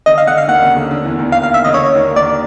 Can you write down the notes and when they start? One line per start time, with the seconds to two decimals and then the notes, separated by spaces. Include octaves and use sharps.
0.06 D3 D#5
0.18 F5
0.27 D3 F#5
0.38 F5
0.48 D#2 D#3 F#5
0.62 C#3
0.77 D3
0.91 D3
1.04 E2 E3
1.19 D#2 D#3
1.32 F5
1.43 F5
1.54 E5
1.65 C#3 D#5
1.74 D3 C#5
1.95 D#2 D#3
2.16 D#2 D#3 D5